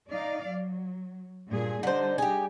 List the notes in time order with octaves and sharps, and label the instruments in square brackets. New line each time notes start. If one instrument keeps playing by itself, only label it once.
[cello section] D#4 D5 F5
F#3
G2 A#2 G#4
[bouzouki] D3 C5 [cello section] G3 D4 D#4
[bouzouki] G4 G#4